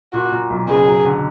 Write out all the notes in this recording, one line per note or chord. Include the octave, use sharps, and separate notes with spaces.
A#2 F#4
A#2
B1
F#1 G#4
F#3
D3